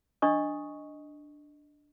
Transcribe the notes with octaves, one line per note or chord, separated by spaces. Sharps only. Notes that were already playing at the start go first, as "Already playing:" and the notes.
D4 D#5 C#6 D#6